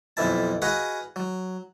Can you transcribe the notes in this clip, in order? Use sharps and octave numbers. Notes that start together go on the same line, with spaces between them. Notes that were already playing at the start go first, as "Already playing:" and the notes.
B1 F2 E3 E4 A5
F#4 G#4 B4 D#5 F5 F#5
F#3